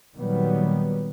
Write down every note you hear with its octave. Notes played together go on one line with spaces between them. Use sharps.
A#2 D#3 F#3 G3 B3